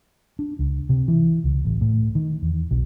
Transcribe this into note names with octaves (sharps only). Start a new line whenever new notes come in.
D4
C#2
C3
E3
C#2
A1
A2
D#3
E2
B1